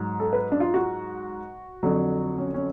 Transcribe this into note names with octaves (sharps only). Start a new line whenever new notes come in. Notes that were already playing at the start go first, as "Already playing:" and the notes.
Already playing: G#2 F#3
A4
B4
D4
F4
F#4
F2 D3 F#3
C#4
C#4